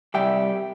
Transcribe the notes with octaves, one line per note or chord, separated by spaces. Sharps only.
C2 C3 G3 E5 G5